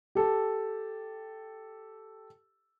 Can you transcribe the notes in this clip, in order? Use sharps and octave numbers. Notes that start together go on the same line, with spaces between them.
G4 A4